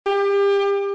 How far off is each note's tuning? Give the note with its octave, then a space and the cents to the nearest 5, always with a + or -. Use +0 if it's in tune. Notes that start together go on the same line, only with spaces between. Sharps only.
G4 +30